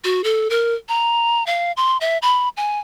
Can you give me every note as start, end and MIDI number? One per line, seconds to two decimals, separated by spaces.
0.04 0.23 66
0.24 0.48 69
0.50 0.74 70
0.89 1.46 82
1.46 1.72 77
1.77 1.97 84
2.01 2.18 76
2.22 2.49 83
2.57 2.80 80